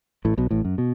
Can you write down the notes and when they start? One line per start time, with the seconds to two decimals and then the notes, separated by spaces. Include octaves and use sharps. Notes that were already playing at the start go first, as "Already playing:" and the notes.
0.25 A1 A2
0.38 B1 B2
0.51 A1 A2
0.65 F#2
0.78 B2